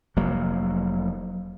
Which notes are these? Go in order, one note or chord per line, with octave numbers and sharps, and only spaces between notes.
F1 F#3 A#3